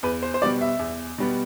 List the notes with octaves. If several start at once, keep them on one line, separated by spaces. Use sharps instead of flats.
E2 B4
C5
C5
B2 G3 B3 D5
E5
E2
B2 G3 B3